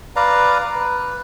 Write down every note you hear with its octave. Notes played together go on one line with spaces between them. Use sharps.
B4 D5 F5 A#5
B4